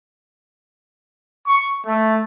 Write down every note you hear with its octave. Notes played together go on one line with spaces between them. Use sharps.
C#6
A3